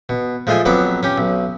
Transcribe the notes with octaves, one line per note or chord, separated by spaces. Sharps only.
B2
F3 G#3 A3 F4 G#5
F2 F#3 B3 B4 D6
C#4 G4
B1